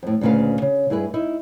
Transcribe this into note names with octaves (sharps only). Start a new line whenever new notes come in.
F2 A2
D2 A#2 C#3 B4 F5
C#3
G2 E4 G#4 B4
D#4 E4